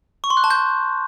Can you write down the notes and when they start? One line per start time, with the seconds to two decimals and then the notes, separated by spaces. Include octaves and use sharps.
0.24 C#6
0.30 C6
0.37 F#6
0.44 A5
0.50 G6